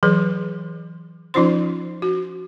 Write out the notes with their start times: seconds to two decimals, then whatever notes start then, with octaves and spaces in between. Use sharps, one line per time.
0.03 E3 F#3 G#4 B4
1.34 F3 C#4 D#4 F4 C5 C6
2.02 F#4